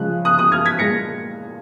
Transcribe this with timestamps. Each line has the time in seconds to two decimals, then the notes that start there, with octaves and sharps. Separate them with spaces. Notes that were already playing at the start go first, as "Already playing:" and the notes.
Already playing: C#3 F3 G#3 F#6
0.25 D#6 F#6
0.39 D#6 F#6
0.52 F6 G#6
0.66 G#6 B6
0.79 A#2 G#3 A#6 C#7